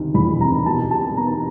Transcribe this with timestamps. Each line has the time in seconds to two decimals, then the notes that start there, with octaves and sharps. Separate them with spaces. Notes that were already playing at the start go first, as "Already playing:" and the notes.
Already playing: D2 C3 D#3
0.14 E2 B5
0.40 C3 A#5
0.66 B2 A5
0.91 G3 A5
1.17 B3 A#5